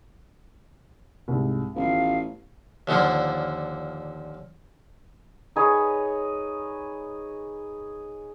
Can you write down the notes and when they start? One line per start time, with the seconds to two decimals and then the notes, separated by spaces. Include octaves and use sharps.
1.28 C2 G#2
1.75 A1 F3 B3 F5
2.87 D#2 A#2 D3 F3
5.56 D#4 G#4 B4 C#5